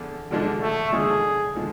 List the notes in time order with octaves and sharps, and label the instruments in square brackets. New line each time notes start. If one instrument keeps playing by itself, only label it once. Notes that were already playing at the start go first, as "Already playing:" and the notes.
Already playing: [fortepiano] E2 D3 F3
E2 D3 F3 G#3 D4
[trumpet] A3
[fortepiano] E2 D3 F3 G#3 D4 [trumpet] G#4
[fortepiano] D3 F3 G#3